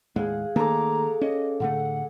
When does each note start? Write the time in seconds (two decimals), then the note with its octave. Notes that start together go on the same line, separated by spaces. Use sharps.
0.16 D#2 A2 G#3 G#4 F5 F#5
0.56 D#3 A3 A#3 G#4 A4 A#5 D6
1.21 C#4 D#5
1.60 A2 D3 A3 F#5